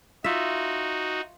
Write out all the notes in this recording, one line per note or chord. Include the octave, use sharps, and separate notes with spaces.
D#4 F4 F#4 E5